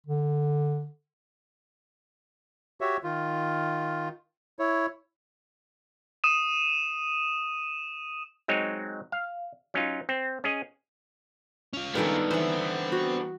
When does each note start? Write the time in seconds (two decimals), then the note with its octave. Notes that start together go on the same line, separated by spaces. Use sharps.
0.07 D3
2.81 F#4 G4 C#5 E5
3.04 D#3 F4
4.59 E4 C#5
6.24 D#6 D#7 E7
8.48 F#3 G#3 C4 D#4 C#5
9.12 F5
9.74 F#3 C#4 D#4 F4
10.09 C4
10.44 C#4 G#4 D#5
11.73 C#4 F4
11.95 D#3 G3 G#3 B3 D4 A4 A#4
12.31 E3 C4 C5 A5 B5
12.92 F#4